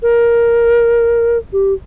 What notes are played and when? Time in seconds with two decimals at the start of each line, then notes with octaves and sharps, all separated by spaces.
0.03 A#4
1.53 G4